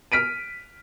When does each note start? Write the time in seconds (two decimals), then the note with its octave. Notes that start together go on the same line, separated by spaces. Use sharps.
0.12 F6 B6 D7 D#7